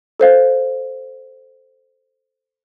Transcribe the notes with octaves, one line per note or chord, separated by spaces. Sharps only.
A4 C5 F5